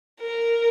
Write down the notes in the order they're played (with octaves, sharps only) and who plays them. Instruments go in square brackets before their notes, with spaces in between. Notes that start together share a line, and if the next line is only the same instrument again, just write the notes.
[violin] A#4